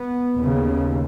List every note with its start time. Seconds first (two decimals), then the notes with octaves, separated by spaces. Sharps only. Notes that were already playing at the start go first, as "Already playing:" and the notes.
Already playing: B3
0.37 D#2 C#3